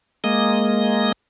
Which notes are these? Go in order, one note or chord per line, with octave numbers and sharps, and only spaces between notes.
G#3 A#3 D#6